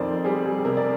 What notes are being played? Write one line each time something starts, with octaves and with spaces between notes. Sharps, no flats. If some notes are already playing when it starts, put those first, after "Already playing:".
Already playing: F2 D#3 A#4 C5 D5
G3 G#4
G#4
C3 A#4
D5